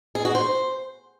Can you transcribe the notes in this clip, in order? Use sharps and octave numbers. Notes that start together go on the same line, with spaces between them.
G#4
F#4
C5